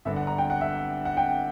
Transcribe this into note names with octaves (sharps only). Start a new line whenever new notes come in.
G1 G2 D3 E5
F#5
A#5
G5
F#5
E5
F#5
G5